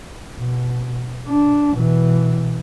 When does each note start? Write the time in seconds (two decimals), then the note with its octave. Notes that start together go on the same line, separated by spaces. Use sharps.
0.36 B2
1.28 D4
1.74 B2 E3